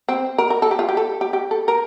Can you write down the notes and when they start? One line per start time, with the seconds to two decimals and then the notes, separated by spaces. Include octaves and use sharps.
0.09 C4
0.38 A#4
0.50 A#4
0.62 A4
0.71 G4
0.79 F4
0.89 G4
0.97 A4
1.21 G4
1.33 G4
1.51 A4
1.68 A#4